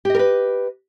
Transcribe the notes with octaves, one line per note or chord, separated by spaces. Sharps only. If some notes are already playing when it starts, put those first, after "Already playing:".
G4 A#4 B4 D#5